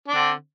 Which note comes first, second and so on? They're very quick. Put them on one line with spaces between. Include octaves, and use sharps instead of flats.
D4 C4 D3